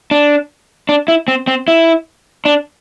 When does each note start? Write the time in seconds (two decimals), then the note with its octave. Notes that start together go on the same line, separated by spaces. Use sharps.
0.11 D4
0.89 D4
1.08 E4
1.28 C4
1.47 C4
1.68 E4
2.45 D4